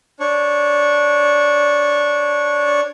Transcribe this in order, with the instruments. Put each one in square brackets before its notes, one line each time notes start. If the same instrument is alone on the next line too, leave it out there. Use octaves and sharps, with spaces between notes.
[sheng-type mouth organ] D4 C#5